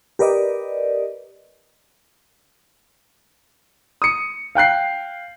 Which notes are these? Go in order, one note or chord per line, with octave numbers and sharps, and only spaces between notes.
G4 A#4 B4 D5 D#5
D#6 C#7
F5 G5 F#6 C7